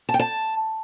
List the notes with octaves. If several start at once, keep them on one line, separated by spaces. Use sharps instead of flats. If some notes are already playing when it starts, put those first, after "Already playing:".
A5
G5
A5